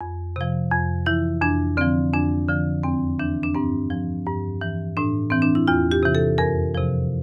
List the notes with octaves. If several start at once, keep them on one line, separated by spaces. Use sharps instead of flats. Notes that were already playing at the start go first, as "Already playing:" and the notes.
F2
C3 F3
F2
E3 E4
F2 D4
D3 F3 C4
F2 D4
D3 F3
E2 C4
E3 D4
D4
G2 C4
F3
G2
E3
A2 D4
E3 C4
D4
E4
E2 F4
G4
C3 E3
A4
F2 A#4
C3 F3